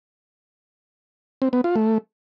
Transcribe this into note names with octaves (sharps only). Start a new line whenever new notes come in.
C4
B3
F4
A3